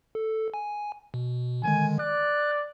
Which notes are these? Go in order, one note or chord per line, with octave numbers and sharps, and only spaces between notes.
A4
G#5
B2
D3 D#3 G#3 G#5
D5 F#6